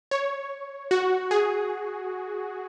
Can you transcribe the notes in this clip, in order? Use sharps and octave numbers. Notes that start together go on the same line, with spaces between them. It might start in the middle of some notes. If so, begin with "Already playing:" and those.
C#5
F#4
G#4